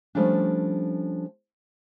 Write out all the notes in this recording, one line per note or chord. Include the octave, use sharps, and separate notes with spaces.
F3 G3 A3 C#4 D4